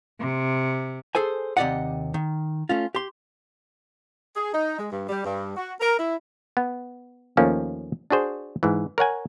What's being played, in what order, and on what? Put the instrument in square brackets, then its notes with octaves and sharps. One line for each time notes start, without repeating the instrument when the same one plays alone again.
[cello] C3
[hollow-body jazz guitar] G#4 A4 C5 G#5
D#2 C3 G4 D5 D#5 F#5
D#3
A3 C#4 F4
G4 C6
[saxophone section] G#4
D#4
G#3
G2
G3
G2
F#4
A#4
E4
[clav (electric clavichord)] B3
D#2 F3 A3 A#3 C#4
D4 F#4 G#4 C5
G#2 E3
A#4 C#5 F#5 G#5